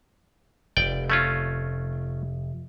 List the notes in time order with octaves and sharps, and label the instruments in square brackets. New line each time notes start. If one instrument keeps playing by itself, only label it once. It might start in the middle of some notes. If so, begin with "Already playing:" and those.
[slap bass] F1 [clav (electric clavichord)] D5 G5
[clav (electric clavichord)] A3 C#4 F4